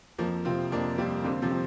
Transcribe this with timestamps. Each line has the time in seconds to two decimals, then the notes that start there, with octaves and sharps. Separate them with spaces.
0.18 F2 F3 A#3
0.45 C3 C4 F4
0.72 F2 A#3 D4
0.98 G3 A#3 C4
1.24 D3 G3 C4
1.42 C3 F3
1.51 C4